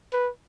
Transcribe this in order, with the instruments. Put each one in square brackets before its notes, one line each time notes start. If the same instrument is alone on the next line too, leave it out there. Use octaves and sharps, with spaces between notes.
[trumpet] B4